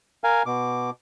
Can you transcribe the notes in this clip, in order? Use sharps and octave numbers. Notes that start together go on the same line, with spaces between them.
A#4 F5 G#5
B2 D6